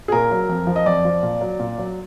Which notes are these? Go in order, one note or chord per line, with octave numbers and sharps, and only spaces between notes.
G#4
A#2 A#4
F#3
F2
F3
D#5
F2 D5
F3
A#2
F#3
A#2
F#3